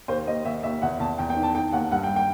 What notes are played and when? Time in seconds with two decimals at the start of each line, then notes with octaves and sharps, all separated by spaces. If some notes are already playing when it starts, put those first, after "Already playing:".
0.08 D#2 C5
0.27 D#2 D#5
0.45 D#2 E5
0.63 D#2 E5
0.82 E2 F#5
0.99 E2 A5
1.18 E2 G5
1.30 G5
1.36 D#3
1.43 A5
1.55 D#3 G5
1.72 D#2 F#5
1.92 G2 F#5
2.03 G5
2.16 G5